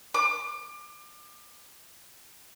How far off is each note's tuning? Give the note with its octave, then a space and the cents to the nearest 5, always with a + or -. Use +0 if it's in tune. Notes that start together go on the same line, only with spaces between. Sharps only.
D6 +30